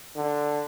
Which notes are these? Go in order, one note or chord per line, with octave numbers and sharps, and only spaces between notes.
D3